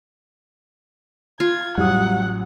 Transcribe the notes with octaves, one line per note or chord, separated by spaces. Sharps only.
F4 G#6
A1 F#3 G3 F#5 D#6